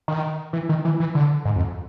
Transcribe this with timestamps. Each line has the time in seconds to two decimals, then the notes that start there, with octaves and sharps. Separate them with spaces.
0.08 D#3
0.53 E3
0.69 D#3
0.85 E3
1.00 E3
1.15 D3
1.45 G#2
1.56 F2